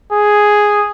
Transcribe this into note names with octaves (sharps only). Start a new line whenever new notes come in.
G#4